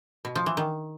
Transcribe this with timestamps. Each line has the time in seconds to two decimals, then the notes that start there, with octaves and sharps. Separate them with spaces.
0.25 B2
0.35 F3
0.46 E3
0.57 D#3